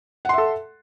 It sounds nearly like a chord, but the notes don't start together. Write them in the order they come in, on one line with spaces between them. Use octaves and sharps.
F#5 C6 E5 A4